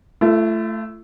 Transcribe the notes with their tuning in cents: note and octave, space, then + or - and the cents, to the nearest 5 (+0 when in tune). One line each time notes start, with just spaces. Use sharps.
A3 +0 F4 -45